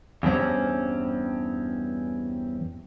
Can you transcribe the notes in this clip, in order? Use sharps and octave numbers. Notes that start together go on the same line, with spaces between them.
E2 G2 C4 C#4